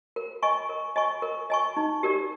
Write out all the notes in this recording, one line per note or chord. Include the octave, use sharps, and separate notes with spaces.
A#4
D#5 G#5 C#6
A#4
D#5 G#5 C#6
A#4
D#5 G#5 C#6
D#4
G4 A#4 D5